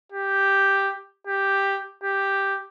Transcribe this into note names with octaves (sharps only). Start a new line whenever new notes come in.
G4
G4
G4